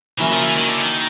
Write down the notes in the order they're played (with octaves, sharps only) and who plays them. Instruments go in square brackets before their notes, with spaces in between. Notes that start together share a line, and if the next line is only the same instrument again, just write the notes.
[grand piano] C#3 F#3 A#3 C#4 E4 [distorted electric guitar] E3
[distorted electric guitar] F3
E3
D#3
D3
D#3